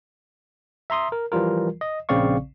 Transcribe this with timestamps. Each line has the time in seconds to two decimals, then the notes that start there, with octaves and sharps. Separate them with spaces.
0.90 E5 A#5 C6 D#6
1.12 A#4
1.32 E3 F3 G3 F4 A#4
1.81 D#5
2.09 A#1 C#3 C4 D5 F5 C#6